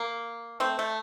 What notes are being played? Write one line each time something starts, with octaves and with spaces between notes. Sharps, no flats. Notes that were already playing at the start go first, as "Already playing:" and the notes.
Already playing: A#3
A3 C4
A3